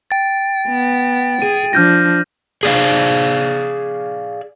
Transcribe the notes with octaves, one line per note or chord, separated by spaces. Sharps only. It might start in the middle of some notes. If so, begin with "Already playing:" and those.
G5 A6
B3
G#4 D#7
F3 D4 F6 G6 A#6
G#4 D5 F5